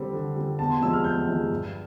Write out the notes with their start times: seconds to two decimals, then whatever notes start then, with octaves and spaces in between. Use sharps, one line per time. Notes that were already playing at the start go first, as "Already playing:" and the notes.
Already playing: D3 G3 C4
0.13 D3
0.36 G3 C4
0.59 E2 A5
0.70 C6
0.81 C3 F3 G#3 E6
0.93 F6
1.04 E2 G6
1.27 C3 F3 G#3
1.51 G2